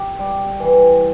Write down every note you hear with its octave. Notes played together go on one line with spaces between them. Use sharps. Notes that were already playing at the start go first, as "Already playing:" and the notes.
Already playing: G4
G3
E3